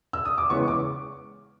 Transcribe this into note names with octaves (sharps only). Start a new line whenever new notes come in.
E6
D#6
D6
C#3 E3 G#3 B3 C#6
D6